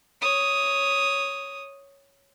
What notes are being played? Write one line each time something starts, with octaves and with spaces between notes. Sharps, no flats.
C#5 D#6